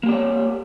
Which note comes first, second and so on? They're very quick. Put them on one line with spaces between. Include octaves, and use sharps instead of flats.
A#3 G4 D5 C#5